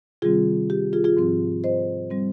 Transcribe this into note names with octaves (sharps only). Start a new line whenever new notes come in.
C3 D#3 G3 C4 F4 G#4
G4
F4 G#4
F4 G#4
G#2 F3 C4
C5 D#5
G3 C4